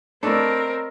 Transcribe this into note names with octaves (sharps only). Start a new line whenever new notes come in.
A3 C4 D4 A#4 C#5 D#5 B5